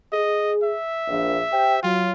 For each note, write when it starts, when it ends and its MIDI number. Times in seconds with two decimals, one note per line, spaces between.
0.13 0.73 68
0.13 0.53 75
0.64 1.81 76
1.08 1.39 34
1.52 1.81 67
1.52 1.81 72
1.52 1.81 79
1.83 2.11 54
1.83 2.13 65